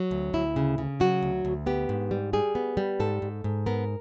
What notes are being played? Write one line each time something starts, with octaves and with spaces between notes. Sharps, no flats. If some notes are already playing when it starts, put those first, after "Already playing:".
Already playing: F#3
D2
D2 E4
C#3
C#3
F#3 F#4
D2
D2
B3 G4
G#2
G3
G3 G#4
B3
G3
G#2 A4
G#2
G#2
B3 A#4